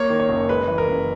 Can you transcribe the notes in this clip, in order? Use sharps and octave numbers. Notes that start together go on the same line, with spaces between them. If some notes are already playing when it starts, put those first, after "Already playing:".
Already playing: A#3 C#5
D#3
C#5
F#1
G#3 B4
E3
A#4
F#1